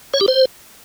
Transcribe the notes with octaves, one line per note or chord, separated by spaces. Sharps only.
C#5
G4
C5